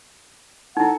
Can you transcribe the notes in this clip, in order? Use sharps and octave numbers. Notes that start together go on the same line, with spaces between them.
D#4 E4 A4 F#5